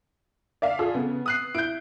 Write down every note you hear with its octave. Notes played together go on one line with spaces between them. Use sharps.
D5 E5 F5
F4 G#4 A4
C#3 B3
D#6 F#6 C7
E4 G6 D7